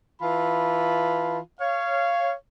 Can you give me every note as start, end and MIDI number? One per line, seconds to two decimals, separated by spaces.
0.21 1.38 52
0.21 1.38 65
0.21 1.38 81
0.21 1.38 83
1.61 2.33 73
1.61 2.33 77